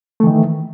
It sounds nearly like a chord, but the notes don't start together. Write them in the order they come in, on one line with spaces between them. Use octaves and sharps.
A3 E3 D#3